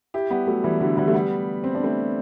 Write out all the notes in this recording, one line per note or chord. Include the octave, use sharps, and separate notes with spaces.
E4 G4
G3 B3
F#3 A3
E3 G3
D3 F#3
E3 G3
A3
G3 B3
C4
D4
A3 C4